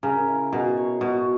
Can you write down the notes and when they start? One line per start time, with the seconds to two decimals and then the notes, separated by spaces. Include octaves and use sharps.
0.03 C#3 A#4
0.28 E4
0.52 B2 G#4
0.77 C#5
1.01 B2 F#4